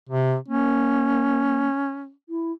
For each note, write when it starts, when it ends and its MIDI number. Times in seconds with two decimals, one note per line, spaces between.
0.09 0.36 48
0.48 1.68 58
0.48 2.11 61
2.29 2.52 64